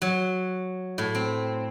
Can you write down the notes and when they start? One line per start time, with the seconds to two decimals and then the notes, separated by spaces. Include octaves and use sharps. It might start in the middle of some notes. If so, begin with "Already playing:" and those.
0.02 F#3
0.98 A2
1.15 C4